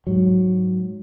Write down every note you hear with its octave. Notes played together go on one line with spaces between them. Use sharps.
G#2 F#3